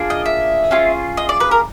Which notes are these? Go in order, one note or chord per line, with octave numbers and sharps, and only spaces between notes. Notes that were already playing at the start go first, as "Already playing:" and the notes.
Already playing: A#3 D4 F4 G#4
D#5
E5
C#4 F4 G#4
D#5
D5
B4
A#4